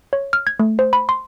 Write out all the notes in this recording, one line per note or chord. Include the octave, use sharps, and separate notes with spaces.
C#5
F6
G#6
A3
C5
B5
C6